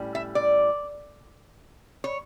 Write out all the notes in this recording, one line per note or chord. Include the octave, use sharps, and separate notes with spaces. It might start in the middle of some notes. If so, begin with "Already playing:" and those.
Already playing: A2 G3 C#4
E5
D5
C#5